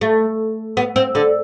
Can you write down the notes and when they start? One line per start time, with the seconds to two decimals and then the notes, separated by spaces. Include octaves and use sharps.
0.01 A3
0.77 B3
0.96 C4
1.15 D3